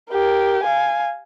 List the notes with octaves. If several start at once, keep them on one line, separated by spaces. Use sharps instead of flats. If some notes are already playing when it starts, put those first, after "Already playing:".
G4 A#4
F5 G#5